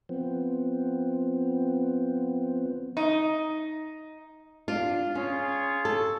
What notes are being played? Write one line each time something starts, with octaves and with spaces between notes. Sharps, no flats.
F3 B3 C4
D#4
D4 F4
C#4 F4 G#4 C#5
A4